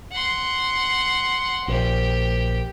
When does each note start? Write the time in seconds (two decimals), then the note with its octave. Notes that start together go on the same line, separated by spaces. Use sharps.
0.12 F#5 C6
1.68 A#1 G4